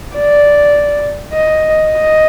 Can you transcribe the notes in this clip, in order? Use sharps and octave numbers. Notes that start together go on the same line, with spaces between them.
D5
D#5
D#5